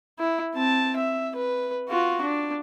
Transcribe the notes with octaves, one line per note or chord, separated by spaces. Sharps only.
E4
C4 A5
E5
B4
F4 F#4
D4